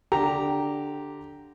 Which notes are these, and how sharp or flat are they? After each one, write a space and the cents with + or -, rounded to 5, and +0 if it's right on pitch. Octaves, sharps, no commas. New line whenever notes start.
D3 +0 G4 -5 A#5 +0